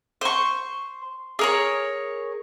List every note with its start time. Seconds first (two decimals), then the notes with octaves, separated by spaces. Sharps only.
0.21 C5 C#6
1.39 G#4 A#4 C#5